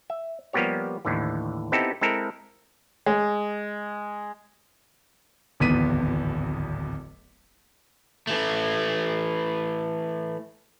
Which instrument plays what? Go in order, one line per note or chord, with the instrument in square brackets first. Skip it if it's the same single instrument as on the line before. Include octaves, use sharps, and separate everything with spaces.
[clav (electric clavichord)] E5
F3 G3 A#3 B3 G4 C#5
D#2 A2 D3 E3
B3 C4 D#4 E4 G4 A4
G#3 C4 E4 A4 A#4
[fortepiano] G#3
[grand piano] D1 G#1 E2 B3 B6 D#7
[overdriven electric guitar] E3 A3